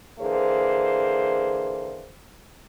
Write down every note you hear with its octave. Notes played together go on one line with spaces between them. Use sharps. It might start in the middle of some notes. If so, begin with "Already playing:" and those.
D3 E3 A#3 G#4 C5